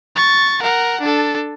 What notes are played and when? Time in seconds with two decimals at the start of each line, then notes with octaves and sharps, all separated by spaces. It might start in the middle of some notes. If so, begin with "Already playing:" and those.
0.16 C#6 A6
0.62 A#4 F#5
1.01 D4 A4